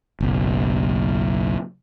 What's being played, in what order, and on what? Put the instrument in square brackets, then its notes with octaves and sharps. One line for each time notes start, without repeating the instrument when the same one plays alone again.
[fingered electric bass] F#1 B1